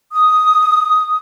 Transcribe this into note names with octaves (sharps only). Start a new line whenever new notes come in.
D#6